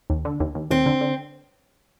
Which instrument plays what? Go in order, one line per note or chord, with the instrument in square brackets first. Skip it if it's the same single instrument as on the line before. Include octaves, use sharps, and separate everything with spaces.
[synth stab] D#2
D3
D#2
D#2
[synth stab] D#2 [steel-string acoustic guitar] C4
[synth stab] D3
D3